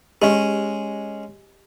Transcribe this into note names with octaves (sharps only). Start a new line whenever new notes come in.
G#3 C#4 G4 D#5